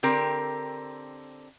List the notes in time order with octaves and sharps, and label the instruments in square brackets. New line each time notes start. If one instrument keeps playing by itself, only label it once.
[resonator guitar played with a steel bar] D3 C4 G4 A#4